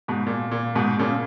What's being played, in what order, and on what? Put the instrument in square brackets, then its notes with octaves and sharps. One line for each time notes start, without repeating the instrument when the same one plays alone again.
[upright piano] G#2 B2
A#2
A#2
G#2 B2
A#2 C#3